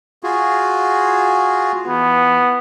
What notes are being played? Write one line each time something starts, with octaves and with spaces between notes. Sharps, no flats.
F4 F#4 G#4
E3 B3